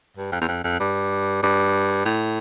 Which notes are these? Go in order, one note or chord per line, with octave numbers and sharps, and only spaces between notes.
G2
F2
E2
F2
F2
G2
G2
A2